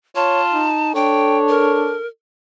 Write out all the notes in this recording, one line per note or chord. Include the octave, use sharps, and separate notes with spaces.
F4 C#5 A5
D#4
D4 A4 C#5 G5
A#4